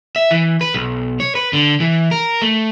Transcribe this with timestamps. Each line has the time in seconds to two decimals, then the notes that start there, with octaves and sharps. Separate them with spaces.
0.16 E5
0.31 E3
0.61 B4
0.74 B1
1.20 C#5
1.35 B4
1.53 D3
1.80 E3
2.11 A#4
2.42 A3